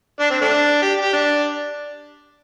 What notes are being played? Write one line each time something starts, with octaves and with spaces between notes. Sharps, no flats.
D4
C4
A3 D4
G4
G4
D4